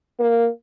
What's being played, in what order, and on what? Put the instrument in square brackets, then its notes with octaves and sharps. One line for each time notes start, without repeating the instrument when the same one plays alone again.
[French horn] A#3